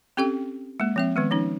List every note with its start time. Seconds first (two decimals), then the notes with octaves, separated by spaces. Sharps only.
0.17 C4 C#4 G4 A4 G5
0.80 G#3 A#3
0.96 F3 C4 E5
1.16 D#3 G#3 B3
1.31 F3 C#4 D#4